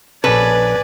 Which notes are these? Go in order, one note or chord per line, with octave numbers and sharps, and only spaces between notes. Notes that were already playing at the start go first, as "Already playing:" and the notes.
A#1 C#4 A4 B4 D5 G#5